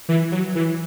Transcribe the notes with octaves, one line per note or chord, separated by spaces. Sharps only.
E3
F#3
E3